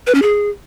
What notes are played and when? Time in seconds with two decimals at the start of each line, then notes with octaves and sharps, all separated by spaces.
0.07 B4
0.15 C#4
0.22 G#4